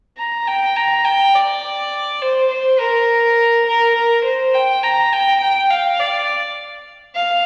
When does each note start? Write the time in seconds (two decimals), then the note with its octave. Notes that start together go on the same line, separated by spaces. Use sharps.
0.18 A#5
0.47 G5
0.76 A#5
1.05 G5
1.34 D5
2.22 C5
2.51 C5
2.79 A#4
3.67 A#4
3.96 A#4
4.25 C5
4.54 G5
4.83 A#5
5.12 G5
5.41 G5
5.70 F5
6.00 D5
7.15 F5